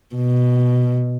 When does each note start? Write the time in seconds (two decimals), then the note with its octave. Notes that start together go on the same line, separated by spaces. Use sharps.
0.15 B2